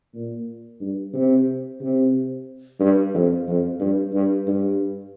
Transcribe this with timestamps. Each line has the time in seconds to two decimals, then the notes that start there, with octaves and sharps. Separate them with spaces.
0.14 A#2
0.81 G2
1.14 C3
1.81 C3
2.80 G2
3.14 F2
3.48 F2
3.80 G2
4.14 G2
4.47 G2